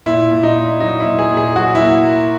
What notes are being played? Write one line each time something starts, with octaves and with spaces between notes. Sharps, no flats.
A#2 E4
A#2
D#4
A#2
F#3 D#4
E4
A#2
G#4
A#2
G#4
F#3 F#4
E4
A#3